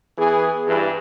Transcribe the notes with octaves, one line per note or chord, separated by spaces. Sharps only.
E3 B3 G#4
G2 E3